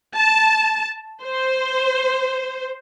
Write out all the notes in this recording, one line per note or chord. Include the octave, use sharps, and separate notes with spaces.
A5
C5